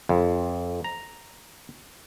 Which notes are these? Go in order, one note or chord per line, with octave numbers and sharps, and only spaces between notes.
F2
A#5